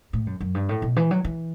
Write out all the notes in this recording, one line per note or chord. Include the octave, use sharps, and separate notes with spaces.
A2
F#2
F#2
G2
A2
B2
E3
F#3
E3